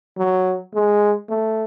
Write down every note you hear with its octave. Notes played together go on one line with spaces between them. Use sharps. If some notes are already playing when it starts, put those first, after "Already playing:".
F#3
G#3
A3